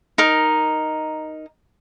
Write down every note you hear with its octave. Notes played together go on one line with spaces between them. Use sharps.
D#4 A#4